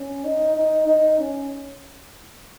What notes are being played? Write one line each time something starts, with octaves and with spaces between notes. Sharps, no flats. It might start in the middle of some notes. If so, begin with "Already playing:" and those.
Already playing: C#4
D#4
D#4
D#4
C#4